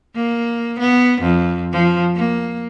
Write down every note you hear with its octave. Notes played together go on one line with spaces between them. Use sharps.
A#3
B3
F2
F3
A#3